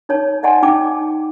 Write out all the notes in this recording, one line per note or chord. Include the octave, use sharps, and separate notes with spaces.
D#4 C#5 A5
D5 D#5 F#5 G#5 A5 C6
D#4 G5 A5 D6